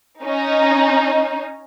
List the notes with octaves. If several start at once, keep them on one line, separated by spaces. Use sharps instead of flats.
C#4 D#4